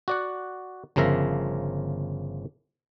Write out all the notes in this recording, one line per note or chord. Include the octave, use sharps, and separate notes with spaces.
F#4 D5 F#5
G1 C#3 F3 A#4 E5 A#5